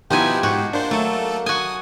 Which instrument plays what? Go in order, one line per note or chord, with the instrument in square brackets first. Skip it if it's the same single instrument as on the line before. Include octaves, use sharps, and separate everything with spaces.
[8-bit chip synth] B2 B3 E4 [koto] F3 D#4 G#5 [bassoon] G4
[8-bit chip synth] G#2 [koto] F#4
[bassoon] A#3 [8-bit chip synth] D4 C5
[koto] F#3 [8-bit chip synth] A3 A4
[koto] F#4 G#5 [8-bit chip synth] D#6